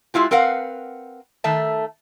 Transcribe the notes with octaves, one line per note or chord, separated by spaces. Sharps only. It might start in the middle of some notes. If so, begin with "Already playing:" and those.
G#3 E4 F4 G4
C4 A#4 B4 F5 F#5
D#3 A3 E5 A5